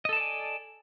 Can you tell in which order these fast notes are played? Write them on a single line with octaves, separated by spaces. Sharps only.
D#5 A4 A5 D5 G#5